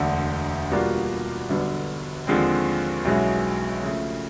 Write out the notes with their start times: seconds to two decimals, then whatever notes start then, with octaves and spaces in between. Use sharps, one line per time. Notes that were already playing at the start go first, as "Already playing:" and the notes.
Already playing: E1 D2 D3
0.71 B2 G3 A#3 D4 F4
1.49 G1 G2 D3 F#3 B3
2.27 D#2 D3 F3 G#3 C4
3.05 B1 B2 G#3 C#4 E4
3.83 C#3 F3 A3